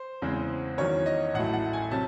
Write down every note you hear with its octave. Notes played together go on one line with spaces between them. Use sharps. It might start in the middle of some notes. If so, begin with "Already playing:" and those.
Already playing: C5
E2 C#3 G#3 C4
E2 D#3 F#3 C#4 C#5
D#5
A1 A2 F#3 A3 F#5
F#5
G#5
C3 F#3 C#4 A5